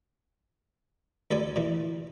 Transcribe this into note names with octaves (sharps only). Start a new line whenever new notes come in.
D2 A4 B4 D5 G#5
A#2 E3